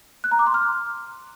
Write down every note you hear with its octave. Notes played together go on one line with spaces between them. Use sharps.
F#6
A#5
D6
C6
F6